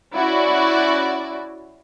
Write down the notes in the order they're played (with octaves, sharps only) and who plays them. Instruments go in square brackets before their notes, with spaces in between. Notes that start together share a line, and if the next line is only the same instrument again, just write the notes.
[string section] C#4 E4 F#4 D5